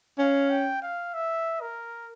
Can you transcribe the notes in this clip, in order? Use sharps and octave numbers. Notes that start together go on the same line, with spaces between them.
C#4 F5
G5
F5
E5
A#4